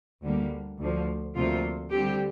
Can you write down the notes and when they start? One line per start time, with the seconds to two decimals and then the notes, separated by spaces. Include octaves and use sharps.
0.22 D2 D3 G3 A#3
0.79 D2 D3 F3
1.35 D2 C3 F3 A#3 F4
1.91 D3 G3 C4 G4